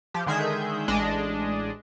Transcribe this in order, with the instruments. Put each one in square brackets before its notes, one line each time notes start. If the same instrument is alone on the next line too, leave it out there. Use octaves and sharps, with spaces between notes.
[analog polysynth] F3 G4
D3 D#3 G#3 G#4 E5 G6
A1 G#3 D4 D#5